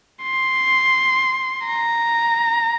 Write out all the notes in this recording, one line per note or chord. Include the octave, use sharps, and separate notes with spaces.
C6
A#5